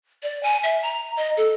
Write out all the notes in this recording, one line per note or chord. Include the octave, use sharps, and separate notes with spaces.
D5
G#5
E5
A#5
D#5
A4